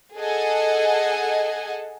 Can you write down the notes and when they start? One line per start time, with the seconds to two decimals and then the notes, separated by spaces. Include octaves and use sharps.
0.18 G#4 A4 D#5 F#5 G#5